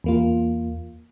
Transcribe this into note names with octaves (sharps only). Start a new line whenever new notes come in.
E2 A#3 F4